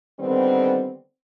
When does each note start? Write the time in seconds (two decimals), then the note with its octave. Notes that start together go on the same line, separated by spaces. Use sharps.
0.20 D3 D#3 G3 B3 C4